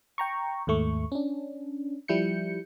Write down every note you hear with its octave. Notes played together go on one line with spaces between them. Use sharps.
G5 A#5 C#6
D#2 G#2 A3 C#6
C#4 D4
F3 G3 E4 G6 C#7